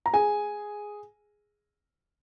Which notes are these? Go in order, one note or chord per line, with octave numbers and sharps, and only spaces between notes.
A#5
G#4 G#5